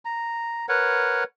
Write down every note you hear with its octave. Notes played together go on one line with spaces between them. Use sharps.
A#5
A#4 B4 C#5 F#5